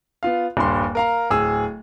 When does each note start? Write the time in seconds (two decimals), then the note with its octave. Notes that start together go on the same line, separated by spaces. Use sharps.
0.23 B3 F4 F5
0.57 D#1 G2 C6
0.95 A#4 F5 A#5
1.30 D1 G#4 E6